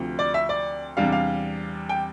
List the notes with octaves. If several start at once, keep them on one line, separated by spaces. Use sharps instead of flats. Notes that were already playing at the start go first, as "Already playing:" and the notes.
Already playing: D2 C3 F3
D5
E5
D5
E2 C3 G3 D4 F5
F5
G5